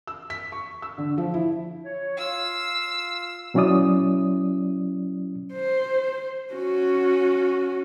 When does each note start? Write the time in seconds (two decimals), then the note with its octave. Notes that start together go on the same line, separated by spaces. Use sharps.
0.07 E6
0.30 B6
0.52 C#6
0.82 E6
0.98 D3
1.18 F3
1.34 E4
1.84 C#5
2.18 F4 F5 E6
3.54 B2 F#3 C#4 E4 D5 D#6
5.53 C5
6.53 C#4 F#4